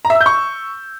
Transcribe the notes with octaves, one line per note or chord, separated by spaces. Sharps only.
A#5
E5
E6
G6
C#6